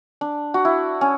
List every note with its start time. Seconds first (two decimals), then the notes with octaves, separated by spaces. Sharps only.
0.21 D4
0.54 F#4
0.65 E4
1.01 C#4